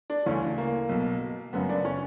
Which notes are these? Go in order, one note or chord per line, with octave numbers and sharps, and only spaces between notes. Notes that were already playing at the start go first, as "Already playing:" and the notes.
D4
D2 C#3 E3 C#4
A#3
B1 B2
F#1 F#2 C#3 B3
D4
C#4